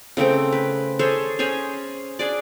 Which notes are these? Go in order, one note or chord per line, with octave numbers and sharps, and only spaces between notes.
C#3 A3 C4 G5
B4
G#4 A4 C5 C#5
C#4 G#4 C5 C#5
D4 G#4 D5